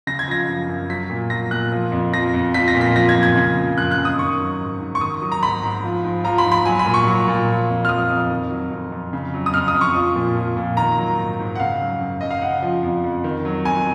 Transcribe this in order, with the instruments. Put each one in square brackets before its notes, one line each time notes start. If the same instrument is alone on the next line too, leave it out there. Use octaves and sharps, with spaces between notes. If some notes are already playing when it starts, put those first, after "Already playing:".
[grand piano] C#3 A#6
G#6
F3 A#6
F#2
F#2
F#3 B6
A#2
F#3 A#6
A#2 F#6
F3
F2
F3 A#6
F2
F3 B6
A#6
A#2
B6
F3 A#6
G#6
A#2
G#6
C#3
F3
F#2 F#6
F#6
F#2
D#6
D#3 C#6
F#3
G#2
G#2
C#6
D#3 D#6
F#3
A#5
G#2 B5
G#2
F3
G#2
F3 A#5
B5
G#2
B5
F#3 G#5
B5
A#2
C#6
F#3
A#2
F3
F2
F6
F3 D#6
F2
D#3
F#3
F2
F2
C#3
F#3
D#6
F2 F6
D#6
F2
C#6
F3
A#2
F3
A#2
D#3 A#5
F#3
G#2
G#2
F#5
C#3 F5
F#3
F#2
F#2 D#5
F5
C#3 F#5
F3
F2
F2
D#3
F#3
F2 G#5